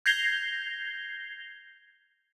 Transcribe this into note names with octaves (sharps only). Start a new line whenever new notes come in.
G6 G#6 A#6 C7 F7 G7